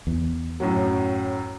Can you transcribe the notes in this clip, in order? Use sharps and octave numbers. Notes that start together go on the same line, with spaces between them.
E2
F#2 A2 F#3